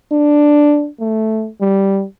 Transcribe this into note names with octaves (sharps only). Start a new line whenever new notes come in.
D4
A3
G3